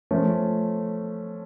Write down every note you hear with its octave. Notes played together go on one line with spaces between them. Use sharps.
F3 A3 C#4